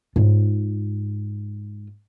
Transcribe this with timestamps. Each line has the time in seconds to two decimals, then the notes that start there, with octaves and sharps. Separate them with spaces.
0.16 G#2 F4